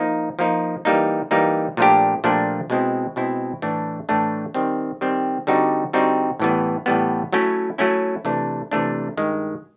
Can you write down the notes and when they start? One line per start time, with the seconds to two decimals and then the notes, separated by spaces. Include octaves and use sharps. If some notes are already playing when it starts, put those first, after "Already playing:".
Already playing: F3 A#3 D#4
0.39 F3 A#3 D#4
0.85 E3 G3 A#3 D#4
1.31 E3 G3 A#3 D#4
1.77 A#2 F3 A3 D4 G4
2.24 A#2 F3 A3 D4 G4
2.70 B2 G#3 C4 E4
3.16 B2 G#3 C4 E4
3.62 A2 E3 A3 D4
4.09 A2 E3 A3 D4
4.54 D#3 G3 C4
5.01 D#3 G3 C4
5.47 D3 G3 C4 D#4 F#4
5.93 D3 G3 C4 D#4 F#4
6.39 A2 E3 G3 B3
6.86 A2 E3 G3 B3
7.33 F#3 A3 C#4 E4
7.78 F#3 A3 C#4 E4
8.25 C3 E3 A3 D4
8.71 C3 E3 A3 D4
9.17 G2 D#3 G#3